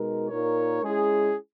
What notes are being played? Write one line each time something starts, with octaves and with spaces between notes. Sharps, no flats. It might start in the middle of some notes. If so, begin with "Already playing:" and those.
Already playing: B2 G#3 D#4 A#4
A#2 A#3 D#4 A#4 C#5
G#3 C#4 E4 G#4